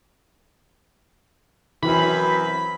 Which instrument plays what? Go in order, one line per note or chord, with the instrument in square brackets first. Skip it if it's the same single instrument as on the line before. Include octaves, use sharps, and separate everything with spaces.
[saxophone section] F#2 C4 B4 [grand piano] E3 [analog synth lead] B5